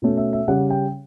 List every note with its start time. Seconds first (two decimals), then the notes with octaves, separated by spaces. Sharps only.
0.02 B2 A3 C#4
0.17 E5
0.33 E5
0.48 C#3 G3 C#4 F#5
0.70 G5